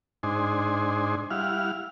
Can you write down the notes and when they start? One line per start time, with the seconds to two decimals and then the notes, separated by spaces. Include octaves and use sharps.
0.23 G#2 D4 D#4 C5 G#5
1.31 G3 E4 F5 F#5 F6